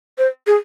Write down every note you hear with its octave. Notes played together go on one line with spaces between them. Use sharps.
C5
G#4